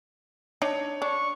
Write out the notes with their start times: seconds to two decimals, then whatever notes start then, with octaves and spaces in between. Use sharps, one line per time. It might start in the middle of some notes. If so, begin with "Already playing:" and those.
0.62 D4 D#4 C#5
1.02 D4 C#6